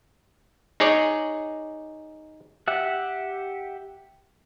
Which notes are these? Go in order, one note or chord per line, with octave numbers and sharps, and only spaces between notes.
D#4 G#4 C#5 D5
G4 E5 F#5